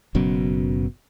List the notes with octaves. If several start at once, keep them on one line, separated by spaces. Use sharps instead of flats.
F#1 F#2 B2